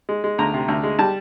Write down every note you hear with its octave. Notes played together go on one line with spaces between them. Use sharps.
G#3
G#3
D2 A#5
C3
D2
G#3
G3 A5